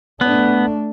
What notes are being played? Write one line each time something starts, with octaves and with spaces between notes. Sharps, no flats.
A3 B3 D4